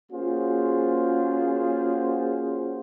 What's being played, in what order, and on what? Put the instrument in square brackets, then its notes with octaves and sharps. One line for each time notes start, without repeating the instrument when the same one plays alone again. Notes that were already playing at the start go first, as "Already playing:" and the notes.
[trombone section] A#3 C#4 F4 F#4 G#4 C5